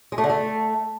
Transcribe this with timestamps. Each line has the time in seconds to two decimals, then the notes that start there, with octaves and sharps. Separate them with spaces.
0.12 G#3
0.18 A3
0.24 D3
0.29 A3